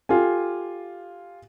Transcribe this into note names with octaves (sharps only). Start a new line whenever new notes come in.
F4 G4 A4 G#5